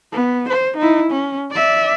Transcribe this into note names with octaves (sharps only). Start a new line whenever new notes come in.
B3
C5
D#4 E4
C#4
D5 E5